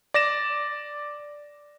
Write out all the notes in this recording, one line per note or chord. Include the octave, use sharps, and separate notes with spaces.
D5 A#6 E7